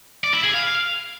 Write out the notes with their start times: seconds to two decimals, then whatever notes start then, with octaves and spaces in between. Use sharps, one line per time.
0.24 D5
0.34 E4
0.44 G#4
0.54 F5